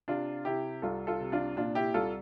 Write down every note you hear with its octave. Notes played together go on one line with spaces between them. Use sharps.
C3 D4 F4
C3 E4 G4
C2 F4 A4
F4 A4
C3
D4 F4
A#2 D4 F4
E4 G4
C2 F4 A4